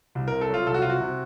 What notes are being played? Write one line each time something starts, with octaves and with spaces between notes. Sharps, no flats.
C2
C3 A#4
A4
F#3 F4
C2 A4
F#4
C3 F4
F#4
C3